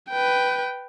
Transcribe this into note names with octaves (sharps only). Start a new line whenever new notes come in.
B4 G5